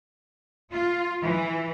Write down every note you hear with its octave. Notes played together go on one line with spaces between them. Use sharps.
F4
E3